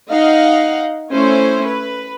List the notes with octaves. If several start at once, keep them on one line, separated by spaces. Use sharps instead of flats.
D#4 D#5 F5 F#5
A3 C#4 E4 C5 C#5
B4